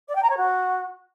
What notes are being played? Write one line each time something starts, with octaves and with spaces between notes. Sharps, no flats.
D5
G5
A#5
C#5
F#4